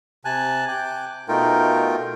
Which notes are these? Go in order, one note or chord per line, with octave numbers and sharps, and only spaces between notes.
C3 G#5 A5 F#6
G5 D6 F#6
B2 A3 D#4 F4 A#4 G5